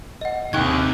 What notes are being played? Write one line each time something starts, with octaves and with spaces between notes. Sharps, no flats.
D#5 F#5
D#2 C3 D#3 G#4 G5 C#6 F#6 G#6